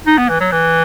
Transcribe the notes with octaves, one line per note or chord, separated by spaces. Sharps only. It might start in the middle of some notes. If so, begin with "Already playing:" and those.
D#4
B3
E3
F#3
E3